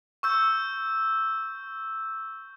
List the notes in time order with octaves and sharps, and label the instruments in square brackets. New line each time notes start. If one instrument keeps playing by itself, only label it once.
[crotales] C#6 E6 G6